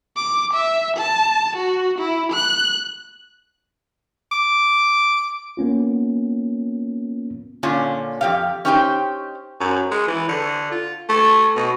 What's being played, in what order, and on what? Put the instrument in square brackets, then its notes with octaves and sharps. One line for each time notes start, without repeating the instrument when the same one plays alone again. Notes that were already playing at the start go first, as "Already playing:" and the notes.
[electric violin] D6
E5
A5
F#4
E4
F#6
[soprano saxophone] D6
[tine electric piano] A#3 B3 C#4 F4
[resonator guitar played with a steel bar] A#2 D3 C#4 F4
F2 G4 F5
C#4 D#4 G4 C5 F#5 G5
[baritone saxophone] F#2
G#3
E3
D3
F4
A3
B2